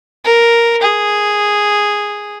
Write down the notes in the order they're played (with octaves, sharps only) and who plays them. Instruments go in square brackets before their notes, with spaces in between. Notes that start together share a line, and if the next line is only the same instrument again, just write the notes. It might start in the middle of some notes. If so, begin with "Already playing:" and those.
[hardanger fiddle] A#4
G#4